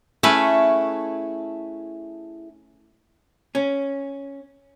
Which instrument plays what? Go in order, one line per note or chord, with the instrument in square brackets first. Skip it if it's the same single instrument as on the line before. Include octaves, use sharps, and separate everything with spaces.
[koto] A3 C#4 B4 [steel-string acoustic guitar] E4 G#4 A4
[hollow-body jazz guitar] C#4